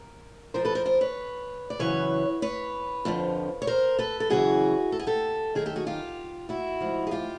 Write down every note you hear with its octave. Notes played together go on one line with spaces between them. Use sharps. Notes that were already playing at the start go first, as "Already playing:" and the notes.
Already playing: A#4
F2 C#3 F3 A#4 C5
A4 B4
A#4 C5
A#4 C5
B4 C#5
D5
F#2 C#3 E3 B4 C#5
B4 C#5
F2 D3 F3
C#5
A#4 C5
A4 B4
A4
F#2 C#3 E3 F#4 G#4
A4
G#4
G4 A4
F#2 D#3 G#4 A#4
G4 A4
F#4 G#4
F4 G4
E4 F#4
G#2 F3
G#4
F4 G4